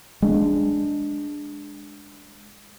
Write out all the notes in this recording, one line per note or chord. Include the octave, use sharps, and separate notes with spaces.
G#3 D4